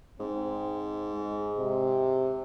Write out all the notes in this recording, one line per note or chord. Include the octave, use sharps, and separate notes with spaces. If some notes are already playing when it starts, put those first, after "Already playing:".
G#2 C4
G#3
C3